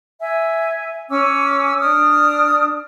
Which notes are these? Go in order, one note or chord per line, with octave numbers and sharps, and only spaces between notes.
E5 G#5
C#4 G#5 D6 E6
D4 D#6 F6